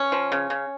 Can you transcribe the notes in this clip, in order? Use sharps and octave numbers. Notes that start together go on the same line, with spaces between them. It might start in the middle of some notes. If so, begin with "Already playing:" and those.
Already playing: C#4
F3
C#3
C#3